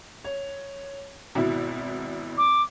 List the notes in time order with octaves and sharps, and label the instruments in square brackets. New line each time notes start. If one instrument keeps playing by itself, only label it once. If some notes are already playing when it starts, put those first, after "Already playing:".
[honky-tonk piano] C#5
G#1 B2 E4
[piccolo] D6